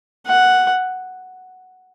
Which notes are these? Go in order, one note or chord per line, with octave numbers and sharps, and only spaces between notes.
F#5